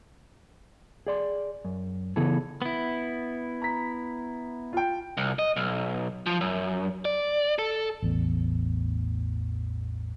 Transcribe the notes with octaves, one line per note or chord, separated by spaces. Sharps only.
G#4 D5 C6
F#2
C#3 E3 B3 E4 G#4 A4
B3 E4
A#5 B6
F4 G5
C2
D#5
B1
F3
F#2
D5
A4
A1 E2